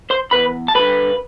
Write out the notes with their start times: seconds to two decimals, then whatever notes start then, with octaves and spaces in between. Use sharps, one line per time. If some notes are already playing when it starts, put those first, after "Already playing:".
0.10 C5 C6
0.31 E2 B4 B5
0.68 A5
0.75 D3 G3 B4 B5